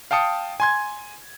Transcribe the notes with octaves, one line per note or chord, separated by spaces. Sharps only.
F5 G5 A5 D#6 C#7
G#5 C6 G#6